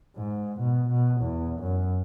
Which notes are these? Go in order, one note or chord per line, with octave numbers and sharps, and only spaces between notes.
G#2
B2
B2
E2
F#2